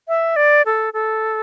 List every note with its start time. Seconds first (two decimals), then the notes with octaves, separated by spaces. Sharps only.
0.08 E5
0.36 D5
0.66 A4
0.94 A4